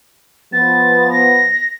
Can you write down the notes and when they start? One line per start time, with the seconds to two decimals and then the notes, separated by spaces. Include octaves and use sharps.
0.53 F3 B3 A6
1.11 A#6